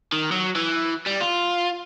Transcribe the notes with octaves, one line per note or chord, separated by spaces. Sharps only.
D#3
F#3
E3
G3
F4